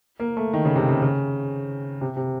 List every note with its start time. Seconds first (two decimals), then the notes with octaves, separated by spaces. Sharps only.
0.20 A#3
0.37 A3
0.53 D#3
0.65 C#3
0.76 C3
0.88 C#3
1.02 C#3
2.01 C3
2.17 C3